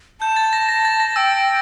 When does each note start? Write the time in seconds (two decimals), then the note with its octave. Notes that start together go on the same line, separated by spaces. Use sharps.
0.21 A5 G6
0.36 A6
0.53 A#6
0.69 A#6
0.85 A6
1.00 A#6
1.16 G5 E6